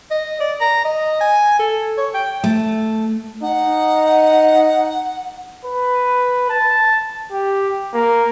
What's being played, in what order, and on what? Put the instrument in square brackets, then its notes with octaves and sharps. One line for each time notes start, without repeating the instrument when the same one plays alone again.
[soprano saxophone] D#5
D5
A#5
D#5
G#5
A4
C#5
G5
[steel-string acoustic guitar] A3
[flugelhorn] D#4 [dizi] F#5
[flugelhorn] B4
A5
G4
A#3